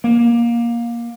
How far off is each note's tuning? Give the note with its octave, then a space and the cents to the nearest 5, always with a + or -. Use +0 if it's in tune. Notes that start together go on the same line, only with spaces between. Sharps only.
A#3 +15